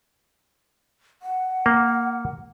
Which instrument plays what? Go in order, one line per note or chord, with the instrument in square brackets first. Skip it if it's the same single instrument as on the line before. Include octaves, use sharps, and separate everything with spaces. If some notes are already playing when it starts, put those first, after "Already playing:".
[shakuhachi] F#5
[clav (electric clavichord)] A#3